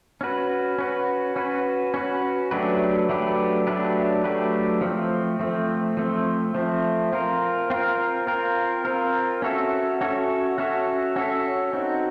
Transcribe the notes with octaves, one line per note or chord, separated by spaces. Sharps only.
C#4 F#4 B4
C#4 F#4 B4
C#4 F#4 B4
C#4 F#4 B4
F#3 A3 D4 G4 B4
F#3 A3 D4 G4 B4
F#3 A3 D4 G4 B4
F#3 A3 D4 G4 B4
F3 A3 C4
F3 A3 C4
F3 A3 C4
F3 A3 C4
C4 F4 A#4
C4 F4 A#4
C4 F4 A#4
C4 F4 A#4
C#4 F#4 A4 C#5 E5
C#4 F#4 A4 C#5 E5
C#4 F#4 A4 C#5 E5
C#4 F#4 A4 C#5 E5
C4 D#4 F#4